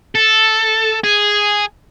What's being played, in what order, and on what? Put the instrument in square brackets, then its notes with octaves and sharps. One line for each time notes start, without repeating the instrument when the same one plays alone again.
[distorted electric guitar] A4
G#4